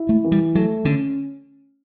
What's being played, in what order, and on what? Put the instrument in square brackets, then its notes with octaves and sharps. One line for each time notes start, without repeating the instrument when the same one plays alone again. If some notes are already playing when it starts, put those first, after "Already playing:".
Already playing: [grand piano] E4
[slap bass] A3
[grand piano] E3
[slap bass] G3
[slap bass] F#3 [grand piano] A3
[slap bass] D3 [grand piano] C#4